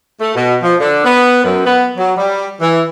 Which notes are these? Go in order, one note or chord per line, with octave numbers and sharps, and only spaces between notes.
A3
B2
F3
D3
B3
F#2
B3
F#3
G3
E3